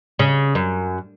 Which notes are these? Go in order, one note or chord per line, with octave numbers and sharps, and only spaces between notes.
C#3
F#2